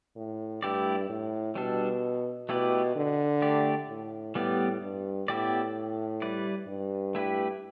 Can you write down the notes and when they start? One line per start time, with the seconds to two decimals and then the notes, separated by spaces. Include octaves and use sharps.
0.16 A2
0.63 G2 A3 E4 G4 D5
1.09 A2
1.55 B2 G3 D4 A4
2.49 B2 A3 E4 G4 B4 D5
2.96 D3
3.42 A3 G4 D5
3.89 A2
4.35 A2 G3 B3 G4 D5
4.82 G2
5.28 A2 B3 E4 G4 D5
6.22 G3 E4 B4 D5
6.68 G2
7.15 A3 E4 G4 B4